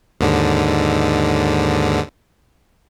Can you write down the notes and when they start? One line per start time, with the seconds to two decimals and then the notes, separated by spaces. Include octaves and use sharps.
0.21 D#2 G#2 D3